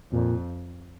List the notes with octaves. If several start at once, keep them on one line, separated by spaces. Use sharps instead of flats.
F2 A#2